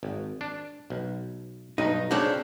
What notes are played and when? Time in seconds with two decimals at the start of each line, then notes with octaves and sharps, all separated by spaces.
0.03 G#1
0.41 D4
0.90 B1
1.78 B1 G2 D#4
2.11 C#3 C4 D4